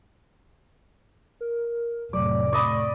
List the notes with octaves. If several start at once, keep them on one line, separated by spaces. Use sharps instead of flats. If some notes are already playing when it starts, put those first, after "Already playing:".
A#4
F1 A2 F#3 D5
D5 D#5 B5 C#6